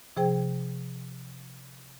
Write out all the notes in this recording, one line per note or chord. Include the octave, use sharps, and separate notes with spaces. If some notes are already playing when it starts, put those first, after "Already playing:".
C3 F3 G#4 C5 G5